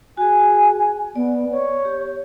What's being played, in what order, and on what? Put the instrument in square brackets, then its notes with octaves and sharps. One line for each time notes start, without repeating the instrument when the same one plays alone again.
[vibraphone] F#4 G#4 [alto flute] G#5
[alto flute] B3 [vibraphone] D5
[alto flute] C#5
[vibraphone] G4